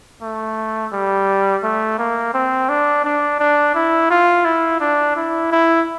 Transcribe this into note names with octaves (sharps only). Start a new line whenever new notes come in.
A3
G3
A3
A#3
C4
D4
D4
D4
E4
F4
E4
D4
E4
E4